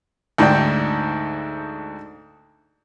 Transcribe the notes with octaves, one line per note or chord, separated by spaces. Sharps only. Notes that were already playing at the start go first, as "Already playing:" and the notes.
D2 G#2 D3 D4 G5